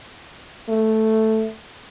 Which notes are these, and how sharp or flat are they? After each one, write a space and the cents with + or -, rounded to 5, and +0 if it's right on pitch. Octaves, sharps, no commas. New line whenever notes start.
A3 +0